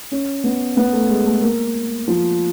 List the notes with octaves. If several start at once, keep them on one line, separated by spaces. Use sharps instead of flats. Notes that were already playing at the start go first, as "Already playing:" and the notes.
C#4
B3
B3
A3
G#3
A3
A#3
F3